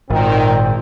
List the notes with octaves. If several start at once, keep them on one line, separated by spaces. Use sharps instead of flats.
G#1 A#2 D#3 C4